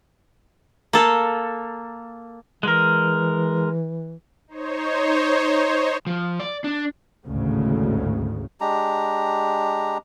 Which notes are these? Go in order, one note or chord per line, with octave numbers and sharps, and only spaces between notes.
A#3 A4
E3 G#3 A#4
D#4 C5 C#5
F3
D5
D4
G#1 D2 A2 C#3
G#3 D4 G4 A#5